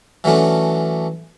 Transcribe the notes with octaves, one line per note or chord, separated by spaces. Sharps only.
E3 F#3 A3 C#4 D4